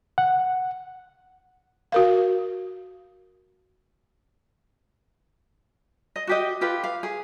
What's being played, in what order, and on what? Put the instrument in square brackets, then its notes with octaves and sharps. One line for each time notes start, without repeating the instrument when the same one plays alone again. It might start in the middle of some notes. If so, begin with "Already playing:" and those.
[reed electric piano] F#5
[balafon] F#4 A#4 F5
[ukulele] D#5
F#4 G4 D#5
F4 G4 B4
F5
G#4